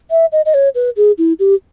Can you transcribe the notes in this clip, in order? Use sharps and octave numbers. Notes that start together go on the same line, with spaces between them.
E5
D#5
D#5
C#5
B4
G#4
E4
G4